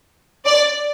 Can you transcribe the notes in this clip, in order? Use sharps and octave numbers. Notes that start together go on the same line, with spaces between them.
D5